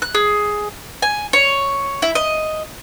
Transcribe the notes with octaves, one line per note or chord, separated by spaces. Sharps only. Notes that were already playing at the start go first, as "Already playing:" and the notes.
F#6
G#4
G#5
C#5
E4
D#5